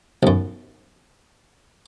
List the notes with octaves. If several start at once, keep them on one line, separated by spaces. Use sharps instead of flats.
B1 F#2